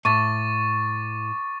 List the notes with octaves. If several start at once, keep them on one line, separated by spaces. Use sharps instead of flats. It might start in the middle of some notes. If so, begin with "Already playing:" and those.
A2 C#6 D6 A6